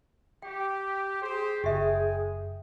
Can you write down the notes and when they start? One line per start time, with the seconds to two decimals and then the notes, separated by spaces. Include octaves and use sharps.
0.42 G4 G5
1.21 G4 G#4 C5
1.64 F#1 G#3 G4 E5 G5 G#5